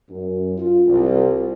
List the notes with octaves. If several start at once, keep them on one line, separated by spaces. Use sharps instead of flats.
F#2
F4
C2